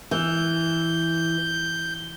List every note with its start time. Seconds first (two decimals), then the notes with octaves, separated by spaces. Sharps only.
0.11 E3 G6